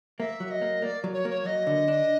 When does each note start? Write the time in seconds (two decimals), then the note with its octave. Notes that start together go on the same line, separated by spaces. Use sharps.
0.19 A#3 E5
0.40 F#3
0.51 D#5
0.62 A#3
0.82 A#3 D5
1.04 F#3
1.14 C#5
1.25 A#3 C#5
1.45 F#3 D#5
1.67 D3
1.88 D4